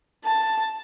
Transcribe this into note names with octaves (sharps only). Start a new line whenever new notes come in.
A5